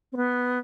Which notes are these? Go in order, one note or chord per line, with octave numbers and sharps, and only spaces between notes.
C4
B3